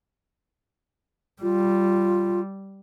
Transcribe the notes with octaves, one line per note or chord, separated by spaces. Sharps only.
G3 F4